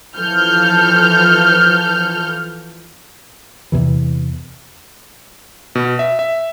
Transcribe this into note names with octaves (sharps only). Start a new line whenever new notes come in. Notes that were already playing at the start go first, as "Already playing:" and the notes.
E3 F3 A4 F6 G6
E2 C3 E3
B2
E5
E5